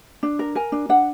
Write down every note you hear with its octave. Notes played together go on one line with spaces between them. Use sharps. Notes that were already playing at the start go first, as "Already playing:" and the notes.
D4
A#4
A#4 G#5
D4
D4 F#5